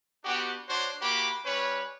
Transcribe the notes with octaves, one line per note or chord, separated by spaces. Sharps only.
B3 D4 F#4 G4
D4 F#4 C5 C#5
A#3 F#4 G4 B5 D6
G3 C#4 B4 C#5